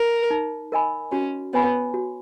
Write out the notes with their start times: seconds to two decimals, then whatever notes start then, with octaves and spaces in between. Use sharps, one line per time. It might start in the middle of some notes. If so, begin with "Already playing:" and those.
Already playing: A#4
0.31 D#4
0.72 A#4 D#5 G#5 B5
1.12 C#4 F#4
1.53 B3 C#5 G#5 B5
1.94 F#4